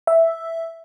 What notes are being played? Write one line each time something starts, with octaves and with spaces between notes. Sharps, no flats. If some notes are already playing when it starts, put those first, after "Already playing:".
E5